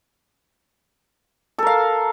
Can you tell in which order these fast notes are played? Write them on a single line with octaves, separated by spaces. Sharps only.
A4 A#4 F5